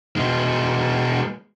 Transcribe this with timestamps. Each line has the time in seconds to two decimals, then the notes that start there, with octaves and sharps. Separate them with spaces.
0.17 B2 G#3